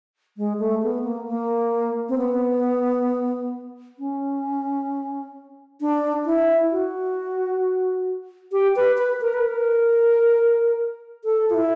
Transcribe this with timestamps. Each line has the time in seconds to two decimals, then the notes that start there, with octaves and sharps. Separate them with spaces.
0.37 G#3
0.59 A3
0.83 B3
1.04 A#3
1.27 A#3
2.09 C4
2.18 B3
3.99 C#4
5.81 D4
6.26 E4
6.72 F#4
8.52 G4
8.76 B4
8.98 B4
9.21 A#4
9.34 B4
9.48 A#4
11.25 A4
11.50 F4
11.54 E4